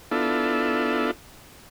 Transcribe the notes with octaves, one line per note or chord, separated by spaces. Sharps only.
B3 D4 E4 F4 A4